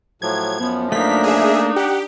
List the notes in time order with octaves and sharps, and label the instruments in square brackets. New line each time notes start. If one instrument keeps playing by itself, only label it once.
[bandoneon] A2 F3 F#3 [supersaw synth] G#6
[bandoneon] F#2 F3 [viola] B3
[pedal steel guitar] A3 A#3 [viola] D4 D#4 [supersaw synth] B6
[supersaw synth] G#4 E5
[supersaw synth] G4 [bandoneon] F#5